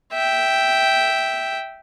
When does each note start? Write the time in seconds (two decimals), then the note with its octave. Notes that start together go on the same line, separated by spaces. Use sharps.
0.13 E5 G5